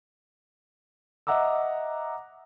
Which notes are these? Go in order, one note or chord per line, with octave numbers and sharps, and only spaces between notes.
D#5 E5 F#5 A#5 D6 E6